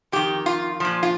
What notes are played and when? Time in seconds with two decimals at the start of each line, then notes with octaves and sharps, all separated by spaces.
0.12 F2 D#3 G4
0.46 F4
0.80 A#2 F3
1.03 F4